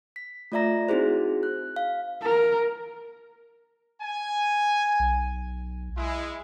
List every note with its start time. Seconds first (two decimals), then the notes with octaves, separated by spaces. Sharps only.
0.16 B6
0.52 A3 F4 D5 E5 A#5 A#6
0.89 C4 D#4 E4 F#4 G#4 C5
1.43 F#6
1.76 F5
2.22 A#4
4.01 G#5
4.99 B1
5.97 G#3 E4